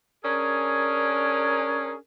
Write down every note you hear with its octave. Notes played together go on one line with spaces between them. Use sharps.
C#4 D4 G#4 A#4